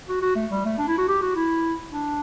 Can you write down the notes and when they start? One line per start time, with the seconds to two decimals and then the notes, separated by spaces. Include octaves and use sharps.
0.09 F#4
0.22 F#4
0.36 A3
0.51 G3
0.65 A3
0.79 D4
0.88 E4
0.98 F#4
1.08 G4
1.22 F#4
1.35 E4
1.92 D4